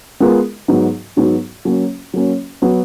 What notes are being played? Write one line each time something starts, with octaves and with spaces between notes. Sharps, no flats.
G#3 B3 F4 A#4
G#2 F#3 B3 D#4
G#2 F#3 B3 D#4
F#3 A#3 C#4
F#3 A#3 C#4
F#3 B3